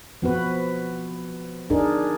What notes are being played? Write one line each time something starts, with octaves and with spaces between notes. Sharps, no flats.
F3 B3 F#4 B4
D4 D#4 G#4 A#4